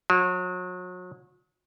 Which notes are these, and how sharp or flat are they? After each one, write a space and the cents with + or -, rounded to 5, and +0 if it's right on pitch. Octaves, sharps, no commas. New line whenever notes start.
F#3 -35